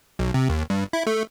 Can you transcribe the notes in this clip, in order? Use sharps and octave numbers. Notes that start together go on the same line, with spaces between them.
B1
C3
D#2
G2
E4
A3